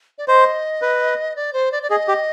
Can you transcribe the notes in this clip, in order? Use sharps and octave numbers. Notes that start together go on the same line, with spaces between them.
D5
C5 D#5
B4
D5
C5
D5
D5
G#4 D#5
G4